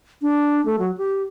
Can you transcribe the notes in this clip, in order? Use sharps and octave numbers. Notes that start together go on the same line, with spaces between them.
D4
A3
F#3
G4